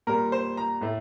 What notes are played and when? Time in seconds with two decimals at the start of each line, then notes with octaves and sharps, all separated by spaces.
0.07 A#2 G3 A#3 A#4
0.32 C5
0.57 A#5
0.81 A2 A3